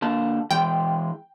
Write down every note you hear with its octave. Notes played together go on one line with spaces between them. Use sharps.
D3 A#3 A5
E3 G#3 G5